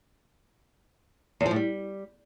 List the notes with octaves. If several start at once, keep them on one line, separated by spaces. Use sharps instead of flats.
E2
F3
A2
G3